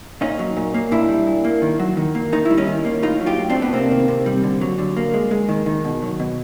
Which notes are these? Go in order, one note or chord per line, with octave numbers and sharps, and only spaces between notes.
A#2 C#4 D#4
F#3
A#2
A#3
A#2 D4 E4
G3
A#2
A#3
D#3
F#3
D#3
A#3
D#3 D#4
E4
G3
C#4 D#4
D#3
A#3
A2 D#4 F4
F#3
F4 G4
A2
C4 D4
A3
B3
C3 A#3 C4
D#3
C3
G3
D3
F#3
D3
A#3
G#3
G#3
D#3
D#3
B2
F#3
B2